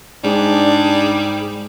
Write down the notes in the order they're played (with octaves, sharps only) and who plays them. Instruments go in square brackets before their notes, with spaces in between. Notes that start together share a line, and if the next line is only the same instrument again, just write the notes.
[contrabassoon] G#2 [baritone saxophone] G3 [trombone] D4 [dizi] G#4